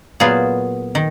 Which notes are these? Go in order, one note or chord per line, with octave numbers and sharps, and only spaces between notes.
A#2 F#3 B3 F4 G#4
D#3